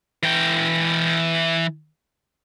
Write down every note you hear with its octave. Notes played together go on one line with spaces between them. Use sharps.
E3 G5